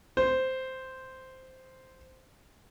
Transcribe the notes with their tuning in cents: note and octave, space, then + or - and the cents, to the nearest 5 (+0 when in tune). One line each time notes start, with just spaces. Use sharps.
C5 -5